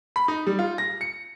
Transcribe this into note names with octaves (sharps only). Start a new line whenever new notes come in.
B5
D#4
G3
F4
A#6
C#7